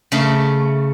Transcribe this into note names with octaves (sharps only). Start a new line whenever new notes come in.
C#3 A3